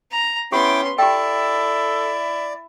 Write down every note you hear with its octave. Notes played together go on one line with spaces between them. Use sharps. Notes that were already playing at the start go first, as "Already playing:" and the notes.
A#5
B3 C#4 E4 G4 G5 C6 D6
E4 G4 A4 D5 G5